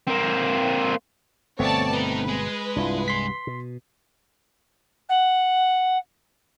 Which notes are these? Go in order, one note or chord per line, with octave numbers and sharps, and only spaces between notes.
A#3 C4
G1 B2 A3 B3 C4 C#5 D5 A5
D#4 A#4 B4
G#3
C2 G2 D4 E4 F4
C6 B6
B2
F#5